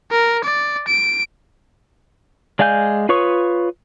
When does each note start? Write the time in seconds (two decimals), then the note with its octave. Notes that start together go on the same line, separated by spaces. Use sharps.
0.11 A#4
0.44 D5
0.88 D7
2.59 G#3 D5 F5 G#5 G6
3.09 F4 B4 C#5 C#6 D#6